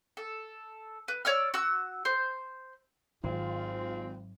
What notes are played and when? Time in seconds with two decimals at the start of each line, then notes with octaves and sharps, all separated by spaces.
0.17 A4
1.08 B4
1.25 C#5 D5 E6 F6
1.54 F#4 E6
2.05 C5
3.24 G#1 G#2 F#3 G#3 C4 F4